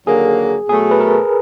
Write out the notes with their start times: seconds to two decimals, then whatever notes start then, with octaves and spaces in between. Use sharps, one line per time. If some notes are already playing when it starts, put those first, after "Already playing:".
0.07 D#2 D3 F#3 A#3 G#4
0.69 B2 F#3 A3 G#4
0.91 B4
1.00 A#4